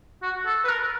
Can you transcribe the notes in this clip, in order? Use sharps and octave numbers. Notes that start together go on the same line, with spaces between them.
F#4
A4
B4
A#4